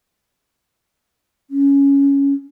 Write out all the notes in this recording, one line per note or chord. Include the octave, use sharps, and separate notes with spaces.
C#4